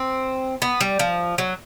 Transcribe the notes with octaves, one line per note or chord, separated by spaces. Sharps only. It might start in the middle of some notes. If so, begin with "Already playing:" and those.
Already playing: C4
B3
G3
F3
F#3